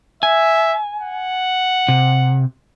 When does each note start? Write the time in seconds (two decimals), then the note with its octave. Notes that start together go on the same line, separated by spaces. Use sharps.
0.23 E5 G#5
1.00 F#5
1.88 C3